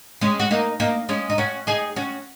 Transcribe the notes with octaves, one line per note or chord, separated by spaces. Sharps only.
G#3 C#4
F#4
A#3 D#4
A#3 D#4
G#3 C#4
D#4
C#4 F#4
D#4 G#4
C#4 F#4